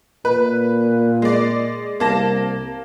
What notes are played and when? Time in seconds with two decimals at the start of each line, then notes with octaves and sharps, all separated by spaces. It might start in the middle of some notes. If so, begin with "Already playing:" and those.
0.25 A#2 B4
1.22 G#3 D5
2.00 C2 A#3 A5 A#6